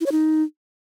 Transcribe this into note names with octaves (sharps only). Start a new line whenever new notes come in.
E4
C#5
D#4